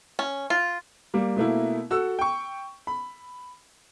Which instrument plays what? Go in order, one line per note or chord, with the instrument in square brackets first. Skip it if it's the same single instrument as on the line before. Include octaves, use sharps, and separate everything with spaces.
[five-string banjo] C#4
F4
[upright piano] G3 A#3
B2 A3 A#3 E4
F#4 A4 E6
G5 C#6
B5